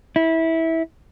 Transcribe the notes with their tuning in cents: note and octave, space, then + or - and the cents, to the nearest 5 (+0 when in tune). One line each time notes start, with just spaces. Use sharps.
E4 -20